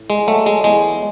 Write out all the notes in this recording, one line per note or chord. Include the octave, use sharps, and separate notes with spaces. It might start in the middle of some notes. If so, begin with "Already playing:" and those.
Already playing: A2
G#3
F#3 A3
G#3
E2 G#3